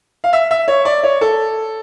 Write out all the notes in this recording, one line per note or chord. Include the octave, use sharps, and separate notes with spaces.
F5
E5
E5
C#5
D5
C#5
A4